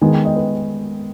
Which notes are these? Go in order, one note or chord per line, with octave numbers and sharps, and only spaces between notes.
D#3 G#3 B3 G#5
G5
D#5
B4